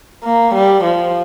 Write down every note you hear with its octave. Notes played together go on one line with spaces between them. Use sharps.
A#3
G3
F3